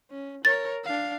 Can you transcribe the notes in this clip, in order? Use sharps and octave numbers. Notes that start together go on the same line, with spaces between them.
C#4
A#4 C#5 A6
D4 F5